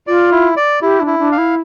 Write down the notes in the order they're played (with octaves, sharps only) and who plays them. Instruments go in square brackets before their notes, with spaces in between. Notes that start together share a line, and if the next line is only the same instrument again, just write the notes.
[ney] F4 [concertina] D5
[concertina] E4
D5
[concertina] E4 [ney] G4
[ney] D4
[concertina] E4
[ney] D4
[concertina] F5
[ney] E4